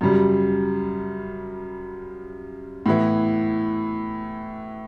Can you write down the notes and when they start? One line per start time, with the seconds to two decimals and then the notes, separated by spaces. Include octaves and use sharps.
0.01 F#2 C#3 G3
2.86 A2 E3 B3 E4